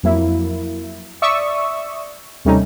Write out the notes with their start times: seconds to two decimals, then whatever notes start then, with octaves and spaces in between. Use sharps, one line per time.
0.03 F2 F#3 A#3 E4
1.22 D5 E5 C#6 D#6 E6
2.45 D#2 C3 G3 A3 C#4 D#4